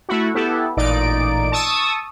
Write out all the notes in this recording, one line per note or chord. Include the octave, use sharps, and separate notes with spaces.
A3 E4 F#4
B3 E4 G4 A4
A1 A#2 D#4 D5 D7
A5 C#6 D#6 E6